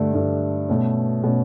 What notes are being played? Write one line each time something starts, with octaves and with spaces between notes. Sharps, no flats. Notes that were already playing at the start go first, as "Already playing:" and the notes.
Already playing: G2 D3 A3
G2 D3 A3
B2 A3 C#4
B2 A3 C#4